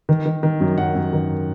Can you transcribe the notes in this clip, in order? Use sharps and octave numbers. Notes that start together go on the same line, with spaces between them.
D#3
D#3
D#3
F#2
F#2 F#5
F#2
D#3